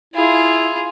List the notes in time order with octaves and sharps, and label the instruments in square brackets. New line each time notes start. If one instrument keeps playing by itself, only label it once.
[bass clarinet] E4 [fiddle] F4 G#4